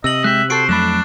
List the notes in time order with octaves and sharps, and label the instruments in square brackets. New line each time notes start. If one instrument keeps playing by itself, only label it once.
[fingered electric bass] C3 [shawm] D#5 [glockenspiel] E6 D#7 F#7
[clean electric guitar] G#3 G4 [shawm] E5 [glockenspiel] F#6
[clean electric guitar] F#4 A4 [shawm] C5 [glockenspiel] C#6 C7 D7
[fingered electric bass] F2 [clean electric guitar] F#3 A3 B5 [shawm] D4 [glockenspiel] E7